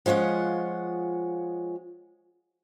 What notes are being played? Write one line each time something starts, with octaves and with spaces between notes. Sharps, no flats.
F3 G#3 C#4 F4 F#5